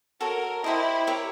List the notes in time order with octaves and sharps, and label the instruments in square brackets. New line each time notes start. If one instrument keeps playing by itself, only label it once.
[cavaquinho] F#4 A4 C#5 [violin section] A#4
[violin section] E4 [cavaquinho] G4 C5 D#5
[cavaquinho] G4 A#4 C#5 E5